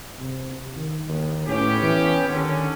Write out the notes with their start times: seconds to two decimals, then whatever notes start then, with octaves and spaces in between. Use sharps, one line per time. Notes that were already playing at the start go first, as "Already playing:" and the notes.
0.19 C3
0.76 D#3
1.09 D#2
1.47 A2 B3 C#4 G4
1.82 E3
2.28 D3 D#3 C#4